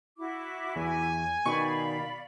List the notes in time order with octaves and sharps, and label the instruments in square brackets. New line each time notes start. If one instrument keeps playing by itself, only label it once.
[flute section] E4 F#4 D6
[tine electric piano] E2 [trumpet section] G#5
[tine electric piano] B2 D#3 [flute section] D5 F5 B5 [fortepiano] C#6